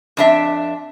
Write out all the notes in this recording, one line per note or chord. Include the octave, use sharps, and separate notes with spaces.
F2 D4 E5